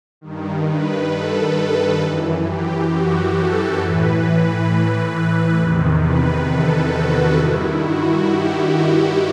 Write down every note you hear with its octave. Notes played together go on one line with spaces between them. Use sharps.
G2 D#3
B4
A4
F#2 E3
G4
F#4
A4
A2 E3 B4
B4
E2 C3 D#3
B4
A4
F#4
G2 D#3 E4
F#4
G4
F#4